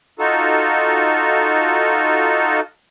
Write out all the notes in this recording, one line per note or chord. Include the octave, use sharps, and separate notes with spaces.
D#4 F4 F#4 A4